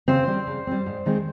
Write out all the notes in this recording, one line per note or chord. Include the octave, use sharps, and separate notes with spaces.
C#3 C4 C5
G3 C4
C#3
G3 C4
G#2
D#3 G#3 C4